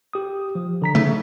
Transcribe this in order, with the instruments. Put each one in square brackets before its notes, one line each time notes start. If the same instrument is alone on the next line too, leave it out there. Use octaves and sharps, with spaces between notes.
[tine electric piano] G4 D#6
F3
D3 A#5 B6
[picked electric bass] C#3 A3 [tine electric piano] D#4